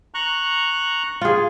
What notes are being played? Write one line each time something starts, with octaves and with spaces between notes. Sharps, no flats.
A#5 C#6 F#6
F4 G#4